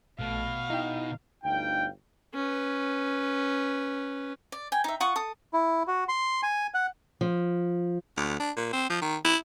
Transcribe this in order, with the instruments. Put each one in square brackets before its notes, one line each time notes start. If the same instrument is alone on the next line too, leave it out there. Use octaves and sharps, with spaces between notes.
[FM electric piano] A#1 A3 A5 [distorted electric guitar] B2 [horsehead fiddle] F5
[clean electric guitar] D#4 [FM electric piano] E4 G5
[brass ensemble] G1 D2 D#4 F5 G5
[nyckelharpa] C#4 B4
[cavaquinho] D5
G5 G#5
D#4 E5
F4 F#5 C#6 D#6
A4 D#6
[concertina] E4
F#4
C6
G#5
F#5
[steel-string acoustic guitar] F3
[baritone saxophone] D2
D4
A#2
C4
F3
D#3
E4